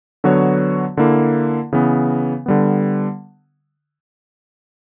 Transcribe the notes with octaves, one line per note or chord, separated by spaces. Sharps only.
D3 F#3 B3 F#4 C#5
D3 A#3 E4
C#3 E3 B3
D3 G3 B3